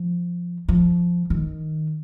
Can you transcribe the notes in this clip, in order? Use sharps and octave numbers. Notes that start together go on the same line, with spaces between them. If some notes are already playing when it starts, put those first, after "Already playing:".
Already playing: F3
F3
D#3